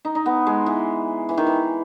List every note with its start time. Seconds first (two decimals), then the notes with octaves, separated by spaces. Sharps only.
0.05 D#4
0.15 D#4
0.26 B3
0.47 G#3
0.66 E3
1.29 E3
1.38 D#3
1.47 E3